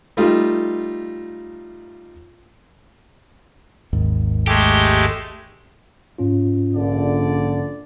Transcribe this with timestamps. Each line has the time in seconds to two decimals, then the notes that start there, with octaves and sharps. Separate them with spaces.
0.17 G3 A3 D#4 F4
3.93 G#1 D#2 G#2
4.47 G#3 A3 G4
6.18 G#2 C#4 F4
6.74 A#1 D3 D5